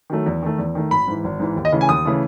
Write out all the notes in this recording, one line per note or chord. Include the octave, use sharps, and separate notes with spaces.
D#3 F#3 A3
E2
D#3 A3
E2
D#3 A3
G#1 B5
G#2 E3
G#1
G#2 E3
D#2
D#5
C#3 E3 A3
G#5
D#2 D#6
C#3 E3 A3